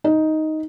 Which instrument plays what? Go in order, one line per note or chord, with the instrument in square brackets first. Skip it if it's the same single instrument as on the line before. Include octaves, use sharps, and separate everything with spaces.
[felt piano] D#4